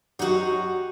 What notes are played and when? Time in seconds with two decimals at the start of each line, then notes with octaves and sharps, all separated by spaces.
0.19 F#2 F#3 D#4 F#4 G4 F#5 G6